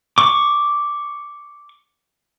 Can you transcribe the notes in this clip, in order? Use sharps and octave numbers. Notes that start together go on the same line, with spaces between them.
C#6 D6